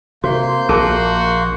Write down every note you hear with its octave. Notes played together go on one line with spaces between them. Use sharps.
C3 A#3 F#4 C6 G6
A#1 F#4 G#4 A#4 A5